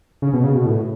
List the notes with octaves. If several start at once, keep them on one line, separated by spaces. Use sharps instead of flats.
C#3
B2
C#3
B2
A2